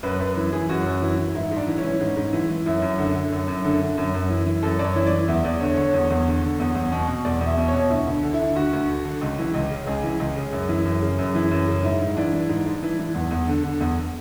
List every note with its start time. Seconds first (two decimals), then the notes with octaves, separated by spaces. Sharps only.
0.03 F#2 B4
0.20 F#2 B4
0.37 E3
0.52 E3 G#4
0.69 F#2 F#4
0.86 F#2
1.02 E3
1.18 E3
1.35 G#2 E4
1.51 G#2
1.56 D4
1.67 E3
1.78 C#4
1.83 E3
2.01 G#2
2.17 G#2
2.33 E3
2.49 E3
2.66 F#2 E4
2.82 F#2
2.98 D3
3.15 D3
3.32 F#2
3.48 F#2
3.64 D3
3.81 D3
3.97 F#2
4.14 F#2
4.30 E3
4.46 E3
4.63 F#2 A4
4.79 F#2 D5
4.84 C#5
4.96 E3
5.06 E3 D5
5.28 E2 E5
5.44 E2 D5
5.60 D3 C#5
5.77 D3 C#5
5.93 E2
6.10 E2
6.26 D3
6.43 D3
6.60 E2
6.75 E2
6.92 B2
7.08 B2
7.25 E2 D5
7.41 E2
7.46 E5
7.57 B2
7.68 C#5
7.74 B2
7.90 D2 E4
8.07 D2
8.23 D3
8.34 E4
8.40 D3
8.56 D2 F#4
8.73 D2
8.88 D3
9.05 D3
9.21 C#2
9.38 E3
9.54 C#2
9.70 C#3
9.87 C#2 G#4
10.03 E3
10.20 C#2
10.36 C#3
10.53 F#2
10.69 E3
10.85 F#2
11.02 C#3
11.18 F#2
11.35 E3
11.51 F#2
11.67 C#3
11.83 G#2 E4
12.00 G#2
12.17 E3 D4
12.33 E3
12.49 G#2
12.66 G#2
12.82 E3
12.99 E3
13.15 E2
13.31 E2
13.48 D3
13.64 D3
13.80 E2